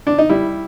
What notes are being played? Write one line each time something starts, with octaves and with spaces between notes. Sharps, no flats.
D4
D#4
G3 E4